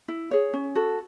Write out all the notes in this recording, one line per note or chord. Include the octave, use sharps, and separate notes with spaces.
E4
G#4 C#5
C#4
F#4 A4